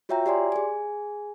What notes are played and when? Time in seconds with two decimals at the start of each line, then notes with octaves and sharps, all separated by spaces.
0.09 F4 F#4 C#5 E5 G5 A#5
0.26 G4 D5 G#5 C6
0.52 G#4 G#5